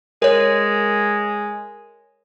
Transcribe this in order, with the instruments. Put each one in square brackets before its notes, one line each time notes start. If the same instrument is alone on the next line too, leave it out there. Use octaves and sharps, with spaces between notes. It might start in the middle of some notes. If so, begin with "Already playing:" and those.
[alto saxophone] G#3 [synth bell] A#4 C#5